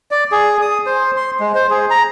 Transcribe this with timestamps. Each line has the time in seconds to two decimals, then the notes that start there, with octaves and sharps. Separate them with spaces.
0.11 D5
0.32 G#4
0.62 D#6
0.86 C5
1.17 C6
1.40 G#3
1.55 C5
1.71 G#4
1.90 A#5